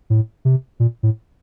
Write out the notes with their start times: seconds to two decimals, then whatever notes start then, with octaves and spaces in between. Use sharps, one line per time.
0.10 A2
0.45 C3
0.80 A#2
1.03 A2